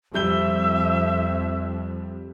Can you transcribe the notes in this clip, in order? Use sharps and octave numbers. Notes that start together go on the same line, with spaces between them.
F2 G3 E5 G6 G7